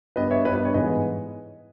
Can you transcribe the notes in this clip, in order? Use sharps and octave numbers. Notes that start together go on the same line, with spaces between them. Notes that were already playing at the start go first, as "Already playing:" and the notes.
G2 G3 B3 B4 D#5
C#5 E5
G2 G3 B3 B4 D#5
B4
C#5
G#2 E3 G#3 B3 B4 D#5